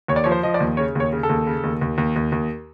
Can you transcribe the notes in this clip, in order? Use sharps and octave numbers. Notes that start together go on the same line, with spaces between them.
D#2 C#5
D5
F3 C#5
C5
F3 D#5
D5
D#2
C#3 C#5
D#2 C#5
C#3
A4
D#2
C#3
D#2
D#2
D#2
D#2
D#2